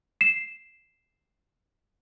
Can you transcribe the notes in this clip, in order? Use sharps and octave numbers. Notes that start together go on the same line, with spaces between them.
C7 E7